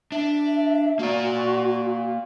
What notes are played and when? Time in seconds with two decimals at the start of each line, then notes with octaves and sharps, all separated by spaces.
0.12 D4 E5
0.99 A#3 F#4 D5